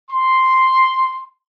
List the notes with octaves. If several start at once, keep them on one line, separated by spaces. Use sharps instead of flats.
C6